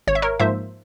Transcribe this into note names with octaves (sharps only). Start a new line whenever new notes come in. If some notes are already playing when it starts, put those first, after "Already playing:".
G#1 C#5
E5
A#4 C#5
G#2 F3 A#3 C5 E5